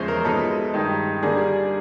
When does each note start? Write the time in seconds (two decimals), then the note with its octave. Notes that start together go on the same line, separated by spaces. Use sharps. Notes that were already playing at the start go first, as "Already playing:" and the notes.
Already playing: E2 C#3 F3 G#3 C5 C#5
0.08 A#4
0.25 B2 G#3 B3 D#4 A4
0.74 G2 D#3 G#3
1.23 D3 G3 A#3 D4 G#4